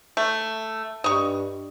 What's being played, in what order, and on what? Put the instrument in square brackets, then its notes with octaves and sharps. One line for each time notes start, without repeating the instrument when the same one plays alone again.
[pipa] A3
[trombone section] G2 [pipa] D#5 C#6